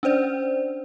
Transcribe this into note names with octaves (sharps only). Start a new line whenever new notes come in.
C#4 D4 C5 D5